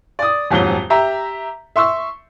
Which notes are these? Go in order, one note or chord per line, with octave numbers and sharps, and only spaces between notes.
D5 D#6
D#1 F2 G#2 F#3 G7
G4 E5 A#5
E5 C6 C#6 E6